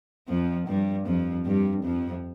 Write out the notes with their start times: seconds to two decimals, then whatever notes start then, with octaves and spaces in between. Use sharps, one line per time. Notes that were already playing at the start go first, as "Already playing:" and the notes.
0.29 F2 F3
0.68 G2 G3
1.07 F2 F3
1.46 G2 G3
1.84 F2 F3